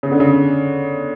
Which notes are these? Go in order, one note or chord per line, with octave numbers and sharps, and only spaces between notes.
C#3
D3
C#3